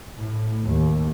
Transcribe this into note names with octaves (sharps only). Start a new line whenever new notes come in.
A2
D#2